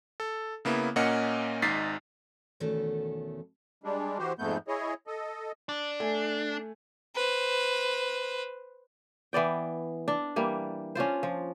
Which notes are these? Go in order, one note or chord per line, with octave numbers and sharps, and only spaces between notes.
A4
C#3 A#3 B3 E4
A#2 A#3 C#4 D#5 F#5 C#7
G#1 G#2 D#4 A6 B6 C7
E2 B2 D#3 A3 C#4 A4
G3 G#3 D4
E3 F#4 G4 C5
F2 G#2 A3 B3 G6
E4 G#4 C#5 D#5
A4 D#5
D4
A3 G#5
B4 C5
E3 B3 D5 G5
D4
E3 G3 A#3
C#4 D4 F4 C5
F3